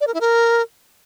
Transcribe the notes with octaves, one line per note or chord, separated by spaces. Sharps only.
D5
A#4
E4
A#4